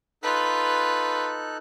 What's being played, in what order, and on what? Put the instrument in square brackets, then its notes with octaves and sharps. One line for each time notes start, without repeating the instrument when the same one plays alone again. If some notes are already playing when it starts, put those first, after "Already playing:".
[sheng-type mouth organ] D#4 A4 F#6 [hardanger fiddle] F4 B4